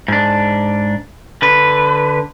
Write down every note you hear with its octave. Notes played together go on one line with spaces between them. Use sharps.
G#2 D4
D3 B4